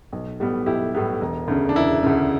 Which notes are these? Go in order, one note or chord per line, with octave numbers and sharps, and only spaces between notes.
B1
A2 G3 B3
B1 E4 G4
A2 G3 B3
E1
D2 C#3
D4
E1 E4
D2 C#3